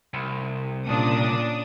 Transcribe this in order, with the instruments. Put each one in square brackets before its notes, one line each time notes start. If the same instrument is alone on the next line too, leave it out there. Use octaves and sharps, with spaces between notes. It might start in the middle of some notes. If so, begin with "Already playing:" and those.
[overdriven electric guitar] C2
[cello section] A#2 [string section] C#3 D4 D#6